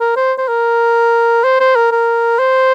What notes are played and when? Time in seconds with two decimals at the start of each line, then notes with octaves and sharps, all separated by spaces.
0.01 A#4
0.16 C5
0.38 C5
0.48 A#4
1.44 C5
1.60 C5
1.76 A#4
1.91 A#4
2.39 C5